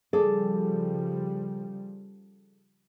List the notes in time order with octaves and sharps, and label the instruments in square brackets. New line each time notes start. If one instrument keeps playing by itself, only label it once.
[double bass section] C#3 F3 G3 [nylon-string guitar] G#4 A4 D5